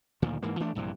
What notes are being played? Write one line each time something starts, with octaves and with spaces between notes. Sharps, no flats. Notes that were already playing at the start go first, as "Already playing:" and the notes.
D2 A#2 D#3 F3
G#2 E3 A#3
E3 A3 D4
A#1 G2 C3 E3